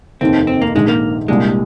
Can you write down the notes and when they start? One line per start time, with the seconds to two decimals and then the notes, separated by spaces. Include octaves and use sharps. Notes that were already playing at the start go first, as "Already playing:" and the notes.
0.21 F1 D#2 D#3 C4
0.47 C4
0.62 A#3
0.74 A#1 G#2 D#3 G#3
0.88 A#3
1.28 C2 A#2 G3 G#3 D4